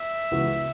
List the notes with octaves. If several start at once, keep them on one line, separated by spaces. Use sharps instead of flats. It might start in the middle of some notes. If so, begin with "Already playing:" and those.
Already playing: E5
C#2 C#3 E3 B3 F#4